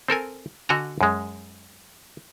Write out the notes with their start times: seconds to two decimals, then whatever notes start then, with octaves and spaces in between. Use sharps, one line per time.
0.08 C4 A4 A#4 G#5
0.69 D3 F#4 D#5 G#5 A#5
1.01 F#2 G#3